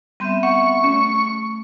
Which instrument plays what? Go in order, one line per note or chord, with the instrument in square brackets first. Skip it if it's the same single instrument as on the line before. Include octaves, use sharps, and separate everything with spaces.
[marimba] G3 C6 G6 [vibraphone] B3 C4 E5
[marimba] F#5 [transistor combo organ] C#6
[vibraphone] A3 [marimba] C#4